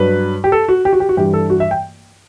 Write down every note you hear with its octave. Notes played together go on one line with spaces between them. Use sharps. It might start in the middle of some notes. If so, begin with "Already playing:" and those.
Already playing: G2 F#3 B4
G4
A4
F#4
G4
F#4
G4
F#4
G2 E3 G3 G4
A4
F#4
E5
G5